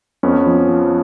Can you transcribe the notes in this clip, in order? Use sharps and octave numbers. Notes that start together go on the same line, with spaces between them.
F2 B3 C#4
F3
F3